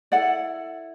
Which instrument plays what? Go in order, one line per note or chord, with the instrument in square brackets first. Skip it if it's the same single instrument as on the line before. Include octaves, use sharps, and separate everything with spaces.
[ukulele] E4 A4 D5 F#5